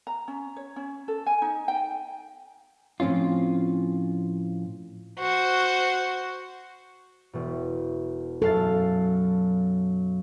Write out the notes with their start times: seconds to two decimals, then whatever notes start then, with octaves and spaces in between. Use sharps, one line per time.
0.07 A#5
0.28 C#4
0.56 C#5
0.76 C#4
1.08 A4
1.27 G#5
1.42 D#4
1.68 G5
3.00 A2 F3 C4 C#4 F4
5.19 F#4 C5
7.33 E1 B2
8.42 F#2 A4 F5 A6